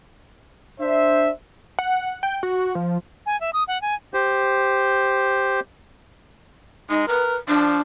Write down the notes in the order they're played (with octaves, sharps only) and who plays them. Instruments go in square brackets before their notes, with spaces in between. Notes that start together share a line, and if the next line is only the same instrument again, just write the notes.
[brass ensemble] D4 C5 E5
[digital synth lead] F#5
G5
F#4
F3
[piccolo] G#5
E5
D#6
F#5
G#5
[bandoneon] G4 C5
[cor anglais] G#3 [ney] D#4
[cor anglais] A#4 [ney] B4
[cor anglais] F3 [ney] D4